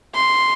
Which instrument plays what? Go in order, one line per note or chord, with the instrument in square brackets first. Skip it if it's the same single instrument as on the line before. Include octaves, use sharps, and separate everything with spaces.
[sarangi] C6